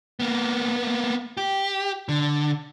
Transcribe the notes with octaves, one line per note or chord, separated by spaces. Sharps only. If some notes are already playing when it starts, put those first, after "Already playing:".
A#3 B3
G4
D3